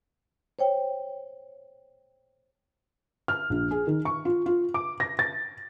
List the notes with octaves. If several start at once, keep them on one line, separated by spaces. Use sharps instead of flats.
C5 C#5 G5
F6
A#1
G#4
D#3
C#6
F4
F4
D6
A#6
A6